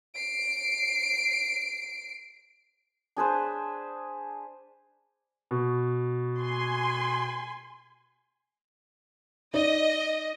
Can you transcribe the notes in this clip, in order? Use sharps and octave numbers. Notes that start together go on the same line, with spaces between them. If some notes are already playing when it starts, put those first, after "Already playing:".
C7 D7
D4 G#4 B4 C5
B2
G#5 C6
D#4 D5 D#5